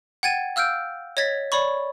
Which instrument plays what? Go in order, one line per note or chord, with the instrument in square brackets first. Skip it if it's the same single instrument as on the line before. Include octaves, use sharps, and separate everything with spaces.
[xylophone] F#5 G5 G#6 A6 D#7
F5 E6 F6 G6 D7
C#5 D#5 G#6 A6 B6
C#5 D5 B5 C#6